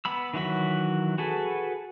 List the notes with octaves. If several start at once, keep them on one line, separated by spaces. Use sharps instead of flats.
B3 B5 E6
D#3 E3 F#3 F#4 B5
F#4 G#4 A4 B4